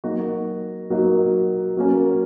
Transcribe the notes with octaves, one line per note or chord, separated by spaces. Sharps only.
F#3 A#3 D#4 F#4
F#3 A#3 D#4 F#4
F#3 A#3 C#4